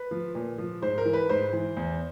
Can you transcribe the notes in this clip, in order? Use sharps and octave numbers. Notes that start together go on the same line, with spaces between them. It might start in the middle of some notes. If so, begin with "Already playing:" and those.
Already playing: B4
F3
A#2
F3
G#2 C5
A#4
E3
B4
G#2 C5
E3
E2